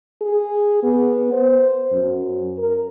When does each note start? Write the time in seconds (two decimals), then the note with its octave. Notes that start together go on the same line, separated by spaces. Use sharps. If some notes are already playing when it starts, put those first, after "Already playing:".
0.22 G#4
0.83 B3
1.33 C5
1.92 F#2
2.58 A#4